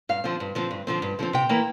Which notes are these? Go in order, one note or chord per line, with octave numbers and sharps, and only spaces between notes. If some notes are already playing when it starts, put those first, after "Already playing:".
G2 F5
D3 F3 C4
G2
D3 F3 C4
G2
D3 F3 C4
G2
D3 F3 C4
C3 G5
E3 A#3 E4